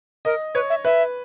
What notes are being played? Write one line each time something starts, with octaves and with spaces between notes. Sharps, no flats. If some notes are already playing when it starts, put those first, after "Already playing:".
A#4 D#5
B4 C#5
E5
B4 E5